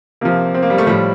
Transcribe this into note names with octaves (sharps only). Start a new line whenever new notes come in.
C3 F3 A#3
C4
A#3
G3
A3
A2 F3 G3